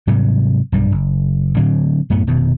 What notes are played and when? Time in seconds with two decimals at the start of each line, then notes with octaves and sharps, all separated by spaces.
0.07 G#2 C3 F#3 G3
0.72 B1 G2 G3
0.92 F#1
1.57 A2 D3 F#3 C4
2.10 F#2 A2 A3 B3
2.27 F1 B2 D#3